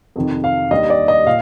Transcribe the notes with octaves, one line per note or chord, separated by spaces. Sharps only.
F2 C3 D#3
F5
D#2 D#3 G3 D4 D#5
D5
D#5
A#2 F5